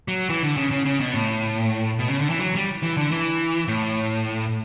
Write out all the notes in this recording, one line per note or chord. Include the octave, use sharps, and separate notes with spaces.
F#3
E3
D3
C#3
C#3
C#3
B2
A2
B2
C#3
D3
E3
F#3
G3
E3
D3
E3
A2